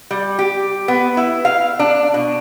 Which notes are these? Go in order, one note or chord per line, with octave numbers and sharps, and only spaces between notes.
G3
G4
B3
E4
F5
D4
B2